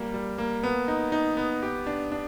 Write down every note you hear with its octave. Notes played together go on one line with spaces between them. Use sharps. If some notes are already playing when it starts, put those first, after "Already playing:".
Already playing: G3 A#3
G3
A#3
B3
D#4
D#4
B3
G4
D4
D4